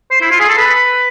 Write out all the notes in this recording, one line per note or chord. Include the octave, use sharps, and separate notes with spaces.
C5
E4
F4
G#4
A4
B4